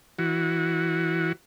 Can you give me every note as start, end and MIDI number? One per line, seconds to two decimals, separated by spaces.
0.19 1.32 52
0.19 1.32 66